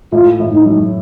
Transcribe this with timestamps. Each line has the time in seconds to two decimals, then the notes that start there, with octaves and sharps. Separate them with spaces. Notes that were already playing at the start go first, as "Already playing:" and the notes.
0.12 A2 F4
0.40 A2
0.52 D#4
0.66 F#3